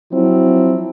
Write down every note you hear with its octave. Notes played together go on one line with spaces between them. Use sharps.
F3 F#3 C4 E4